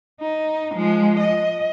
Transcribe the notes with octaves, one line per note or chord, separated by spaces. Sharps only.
D#4
F3 G#3
D#5